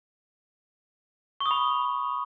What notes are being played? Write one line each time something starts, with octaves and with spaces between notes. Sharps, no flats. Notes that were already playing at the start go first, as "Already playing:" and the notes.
C#6
D#6
B5